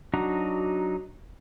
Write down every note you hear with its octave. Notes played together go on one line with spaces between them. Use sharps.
F#3 D4 D#4 F#4 A#5